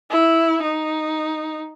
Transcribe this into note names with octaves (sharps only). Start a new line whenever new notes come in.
E4
D#4